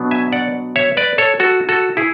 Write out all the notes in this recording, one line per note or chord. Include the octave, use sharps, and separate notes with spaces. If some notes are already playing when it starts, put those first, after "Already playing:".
Already playing: B2 F#3 B3 D4
E5 G#5
D5 F#5
C#5 E5
B4 D5
A4 C#5
F#4 A4
F#4 A4
E4 G#4